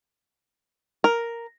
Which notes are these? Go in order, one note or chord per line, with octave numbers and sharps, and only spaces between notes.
A#4